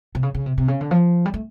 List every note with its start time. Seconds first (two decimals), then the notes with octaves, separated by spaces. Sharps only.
0.15 C3
0.23 C#3
0.34 C#3
0.46 C3
0.58 C3
0.68 C#3
0.81 D3
0.91 F3
1.26 G3
1.34 A3